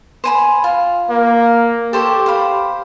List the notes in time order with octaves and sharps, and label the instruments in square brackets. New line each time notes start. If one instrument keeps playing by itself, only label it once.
[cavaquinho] C5 G#5 B5
F4
[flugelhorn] A#3
[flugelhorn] G4 [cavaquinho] A4 C5 C#5
[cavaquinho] C5 F5 B5